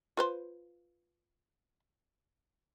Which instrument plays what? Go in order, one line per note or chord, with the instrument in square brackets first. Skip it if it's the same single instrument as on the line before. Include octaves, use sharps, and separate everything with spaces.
[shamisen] F4 B4 C5